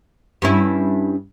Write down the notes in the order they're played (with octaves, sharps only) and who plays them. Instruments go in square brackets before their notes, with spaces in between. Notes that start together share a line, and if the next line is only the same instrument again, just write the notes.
[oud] G2 C#4 E4